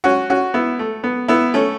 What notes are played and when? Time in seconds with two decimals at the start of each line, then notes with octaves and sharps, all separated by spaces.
0.04 C#4 F#4
0.30 C#4 F#4
0.54 B3 E4
0.79 A3
1.04 B3
1.28 B3 E4
1.54 A3 C#4